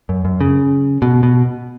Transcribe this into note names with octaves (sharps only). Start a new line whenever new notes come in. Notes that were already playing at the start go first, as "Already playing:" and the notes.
F#2
F#2
C#3
B2
B2